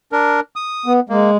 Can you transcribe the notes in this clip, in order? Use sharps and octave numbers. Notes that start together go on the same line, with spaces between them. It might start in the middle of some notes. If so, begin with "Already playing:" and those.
D4 A#4
D#6
B3
G#3 A#3